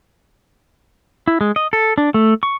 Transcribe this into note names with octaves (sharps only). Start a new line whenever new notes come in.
E4
G#3
D#5
A4
D4
A3
C#6